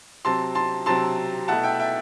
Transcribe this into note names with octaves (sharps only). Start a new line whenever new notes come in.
C3 F#3 C4 A5 C6
A5 C6
C3 F#3 C4 A5 C6
B2 A3 E4 F#5 A5
E5 G5
E5 G5